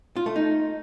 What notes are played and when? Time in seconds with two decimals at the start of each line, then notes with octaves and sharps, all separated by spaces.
0.17 F4
0.26 A3
0.36 D#4